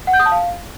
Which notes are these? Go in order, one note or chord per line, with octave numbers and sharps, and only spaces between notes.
F#5
G6
D#6
A5
F5